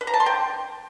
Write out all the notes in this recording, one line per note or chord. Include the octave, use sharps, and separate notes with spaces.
B4
A#5
A5
C6
G5